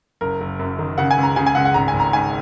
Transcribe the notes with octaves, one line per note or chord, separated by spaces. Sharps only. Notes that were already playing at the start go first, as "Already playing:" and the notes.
F#1 A#4
F#1
F#2
D#3
C#3 F#5
G#5
C#2
A#5
C#3 G#5
G#5
C#2 F#5
F#5
G#1 A#5
G#5
G#1
A#5
G#2 G#5